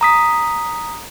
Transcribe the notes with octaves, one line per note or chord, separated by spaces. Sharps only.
A#5 D#6 B6